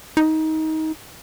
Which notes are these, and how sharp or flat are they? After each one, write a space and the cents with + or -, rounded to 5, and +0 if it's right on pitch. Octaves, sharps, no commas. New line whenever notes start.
D#4 +20